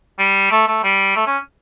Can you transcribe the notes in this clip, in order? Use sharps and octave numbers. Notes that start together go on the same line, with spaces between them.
G3
A3
A3
G3
A3
C#4